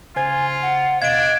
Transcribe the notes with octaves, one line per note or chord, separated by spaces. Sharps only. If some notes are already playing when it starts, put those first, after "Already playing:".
C#3 F4 C5 G#5 G#6
F#5
D#2 B2 D4 D#5 F5 G#6 D7